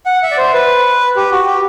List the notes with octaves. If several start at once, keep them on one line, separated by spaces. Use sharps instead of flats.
F#5
E5
D5
C5
B4
G4
F#4
G4